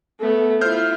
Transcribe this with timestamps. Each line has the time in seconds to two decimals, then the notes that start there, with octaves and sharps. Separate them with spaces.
0.20 A3 B3
0.61 E4 F4 C5 F6 G6